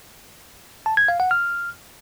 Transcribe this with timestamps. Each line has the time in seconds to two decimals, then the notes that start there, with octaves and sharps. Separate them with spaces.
0.86 A5
0.97 G#6
1.08 F5
1.20 F#5
1.31 F6